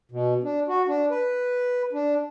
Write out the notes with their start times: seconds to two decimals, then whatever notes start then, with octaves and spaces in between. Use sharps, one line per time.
0.11 B2
0.44 D4
0.68 F#4
0.88 D4
1.11 B4
1.93 D4